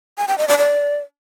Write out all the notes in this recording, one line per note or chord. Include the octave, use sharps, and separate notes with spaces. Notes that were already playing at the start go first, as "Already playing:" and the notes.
G#5
G5
D#5
D5
D5